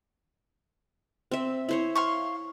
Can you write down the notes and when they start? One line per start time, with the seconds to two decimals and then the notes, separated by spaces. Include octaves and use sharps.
1.31 C4 E5
1.69 E4 C5 C#5
1.95 F5 C6 C#6